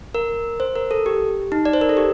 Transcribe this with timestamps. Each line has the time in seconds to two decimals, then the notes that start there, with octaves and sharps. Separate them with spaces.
0.15 A#4
0.60 C5
0.75 A#4
0.91 A4
1.06 G4
1.52 D#4
1.65 D5
1.73 C5
1.81 A#4
1.89 A4
1.97 G4